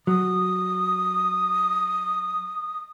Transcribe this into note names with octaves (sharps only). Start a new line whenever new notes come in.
F#3 D#6